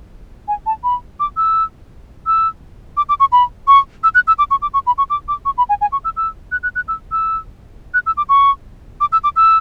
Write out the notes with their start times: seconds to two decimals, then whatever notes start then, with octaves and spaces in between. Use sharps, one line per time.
0.48 G#5
0.66 A5
0.84 B5
1.20 D6
1.37 E6
2.26 E6
2.97 D6
3.09 D6
3.20 C#6
3.32 B5
3.68 C#6
4.04 E6
4.15 F#6
4.27 E6
4.39 D6
4.51 C#6
4.62 D6
4.74 C#6
4.87 B5
4.98 C#6
5.10 D6
5.28 D6
5.45 C#6
5.58 B5
5.69 G#5
5.81 G#5
5.92 C#6
6.04 E6
6.17 E6
6.52 F#6
6.63 F#6
6.76 F#6
6.88 E6
7.12 E6
7.94 F#6
8.06 E6
8.17 D6
8.29 C#6
9.01 D6
9.12 E6
9.24 D6
9.36 E6